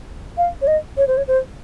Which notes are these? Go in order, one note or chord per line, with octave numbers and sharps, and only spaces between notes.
F5
C#5
D#5
C#5
C5
C#5
C5